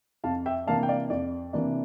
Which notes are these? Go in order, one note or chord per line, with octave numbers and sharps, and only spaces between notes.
F2 F5 A5
E5 G5
C3 E3 A#3 D4 F5 A5
G5
D5 F5
F2 D5
C3 E3 A#3 D4